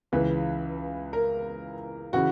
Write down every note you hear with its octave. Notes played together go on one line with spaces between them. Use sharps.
C#2 C#3 E3 B4
A#4
C#3 E3 F#4